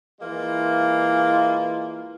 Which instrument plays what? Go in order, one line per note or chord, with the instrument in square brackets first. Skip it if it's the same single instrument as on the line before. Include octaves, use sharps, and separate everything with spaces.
[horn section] E3 G#3 A#3 F4